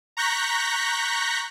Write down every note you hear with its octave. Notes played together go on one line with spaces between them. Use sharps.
A#5 C#6 F#6 G6 A#6 B6